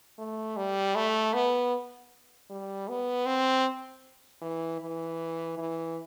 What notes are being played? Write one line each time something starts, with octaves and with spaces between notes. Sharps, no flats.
A3
G3
A3
B3
G3
B3
C4
E3
E3
E3